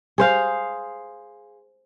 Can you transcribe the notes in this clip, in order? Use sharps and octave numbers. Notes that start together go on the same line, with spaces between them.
G#4 C5 F5